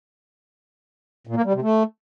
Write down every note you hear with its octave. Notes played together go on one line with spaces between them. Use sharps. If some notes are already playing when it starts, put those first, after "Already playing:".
A#2
A#3
G3
C3
A3